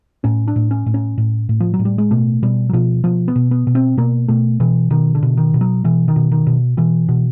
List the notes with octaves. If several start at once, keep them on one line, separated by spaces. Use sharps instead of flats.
A2 C#4
D4
A2
C#4
A2
C#4
A2
A2
F3
F#3
A2
G3
G#3
B2 A3
B2 G3
F#3
B2 F3
B2 F3
B3
B2
B3
B2
C4
B2 A#3
B2 A3
B2 E3
B2 D#3
D3
B2
D#3
B2
F#3
B2 E3
D#3
B2
D#3
B2
B2 E3
B2